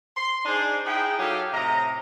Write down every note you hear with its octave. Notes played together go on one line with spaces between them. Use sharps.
C6
D4 D#4 G#4 C5 D5
D#4 E4 G#4 G5
F#3 D#4 G4 A4 F5
A2 C3 D#5 A#5